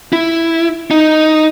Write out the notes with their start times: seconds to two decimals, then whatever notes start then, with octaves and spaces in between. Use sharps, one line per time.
0.13 E4
0.91 D#4